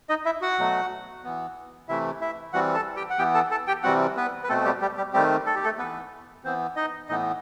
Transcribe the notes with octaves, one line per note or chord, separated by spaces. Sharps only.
D#4 D#5
E4 E5
F#4 F#5
B2 F#3 A3
E3 B3
C3 E3 A3 E4 E5
E4 E5
E3 G3 C4 F#4 F#5
A4 A5
G4 G5
F#5
E3 B3 G4 G5
A4 A5
A4 A5
G4 G5
C3 E3 G3 C4 F#4 F#5
B3 B4
B4
B2 A3 C4 A4
G3 G4
G3 G4
G3 G4
D#3 G3 A3 C4 G4
A4
G4
A3 A4
E3 B3 B4
E3 B3 C4 C5
D#4 D#5
A2 E3 B3 D#4 D#5